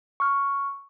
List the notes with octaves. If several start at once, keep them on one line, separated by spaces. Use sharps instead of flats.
C#6 F6